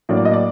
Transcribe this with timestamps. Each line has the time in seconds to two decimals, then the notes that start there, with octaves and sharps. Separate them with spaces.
0.09 A2 F#3 A#3 D4
0.17 D5
0.25 D#5
0.33 D5